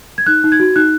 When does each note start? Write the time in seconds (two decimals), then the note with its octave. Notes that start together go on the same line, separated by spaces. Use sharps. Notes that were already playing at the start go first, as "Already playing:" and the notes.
0.18 G#6
0.26 D#4 F#6
0.44 D#4
0.52 G#6
0.60 F#4
0.76 D#4 F#6